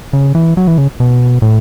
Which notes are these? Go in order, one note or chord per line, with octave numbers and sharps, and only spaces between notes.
C#3
E3
F#3
E3
C#3
B2
A2